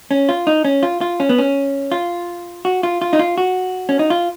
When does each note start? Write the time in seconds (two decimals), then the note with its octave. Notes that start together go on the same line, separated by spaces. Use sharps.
0.11 C#4
0.29 F4
0.47 D#4
0.65 C#4
0.83 F4
1.01 F4
1.20 C#4
1.29 B3
1.38 C#4
1.92 F4
2.65 F#4
2.83 F4
3.02 F4
3.13 D#4
3.19 F4
3.38 F#4
3.89 C#4
3.99 D#4
4.10 F4